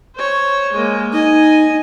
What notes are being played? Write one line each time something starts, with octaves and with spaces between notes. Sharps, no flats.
C5 C#5
G#3 A#3
D#4 D#5 G#5